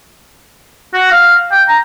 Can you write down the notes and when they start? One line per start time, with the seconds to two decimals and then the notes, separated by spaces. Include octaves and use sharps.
0.94 F#4
1.11 F5
1.52 G5
1.69 A#5